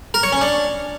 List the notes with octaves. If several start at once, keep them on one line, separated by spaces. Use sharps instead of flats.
A#4
C#5
C#4
D4